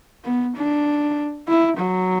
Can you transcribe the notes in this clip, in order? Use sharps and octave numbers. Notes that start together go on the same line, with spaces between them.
B3
D4
E4
F#3